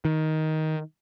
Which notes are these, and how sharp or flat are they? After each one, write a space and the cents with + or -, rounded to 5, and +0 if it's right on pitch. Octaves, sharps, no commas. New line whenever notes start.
D#3 +10